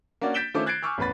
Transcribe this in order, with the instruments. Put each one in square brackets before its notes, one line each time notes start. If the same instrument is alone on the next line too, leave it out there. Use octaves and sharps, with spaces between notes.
[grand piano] A#3 C#4 D4 F#4 D5
G6 A6 B6 D7 E7 G7
D#3 A3 C#4 F4 C5 D6
F#6 G#6 A6 C7 D7
G#5 C#6 D6 E6 F6
A1 E2 B4 B5 A6